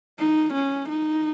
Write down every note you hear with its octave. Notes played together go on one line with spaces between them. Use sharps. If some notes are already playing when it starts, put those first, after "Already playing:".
D#4
C#4
D#4